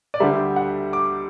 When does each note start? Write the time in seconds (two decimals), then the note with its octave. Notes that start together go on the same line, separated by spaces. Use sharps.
0.14 D5
0.20 D2 D3 G3 E5
0.56 F#5
0.93 D6